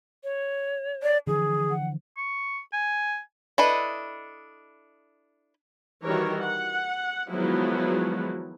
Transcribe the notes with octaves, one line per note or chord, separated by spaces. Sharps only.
C#5
D5
D3 E3 F3 G#4
F#5
C#6
G#5
D4 E4 A4 B4 D#5
D#3 E3 G3 F#4 A#4 C#5
F#5
D#3 F3 F#3 G#3 B3 E4